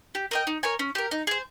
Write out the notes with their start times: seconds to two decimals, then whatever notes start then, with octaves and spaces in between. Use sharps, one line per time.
0.15 G4
0.31 A#4 D#5 G5
0.47 D#4
0.63 A#4 C#5 G#5
0.79 C#4
0.95 G4 A#4
1.11 D#4
1.27 G#4 C5